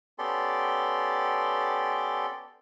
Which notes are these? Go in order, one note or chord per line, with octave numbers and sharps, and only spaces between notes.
B3 C#4 G4 A4 D5 C6